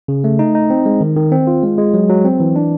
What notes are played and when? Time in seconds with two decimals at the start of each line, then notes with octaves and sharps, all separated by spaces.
0.08 C#3
0.24 A3
0.39 D#4
0.55 D#4
0.70 C4
0.86 G#3
1.01 D#3
1.16 D#3
1.32 C4
1.47 F4
1.63 G#3
1.78 G#3
1.94 F#3
2.09 F#3
2.25 C4
2.40 E3
2.56 D4